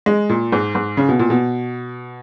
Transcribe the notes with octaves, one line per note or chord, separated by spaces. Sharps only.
G#3
A#2
G#2
G#2
C#3
B2
A#2
B2